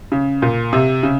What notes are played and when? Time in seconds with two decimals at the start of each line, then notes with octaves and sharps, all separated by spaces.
0.12 C#3
0.42 A#2
0.73 C3
1.03 C#3